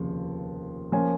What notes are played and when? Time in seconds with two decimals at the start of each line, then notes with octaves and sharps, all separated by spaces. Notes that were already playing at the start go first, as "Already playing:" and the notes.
Already playing: F1 D#2 C#3 F3
0.92 F3 A#3 C#4 G#5